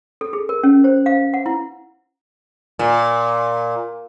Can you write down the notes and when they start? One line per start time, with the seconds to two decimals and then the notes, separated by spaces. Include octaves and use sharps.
0.21 A4
0.33 G#4
0.49 A#4
0.64 C#4
0.84 C5
1.06 F5
1.34 F#5
1.46 E4
2.79 A#2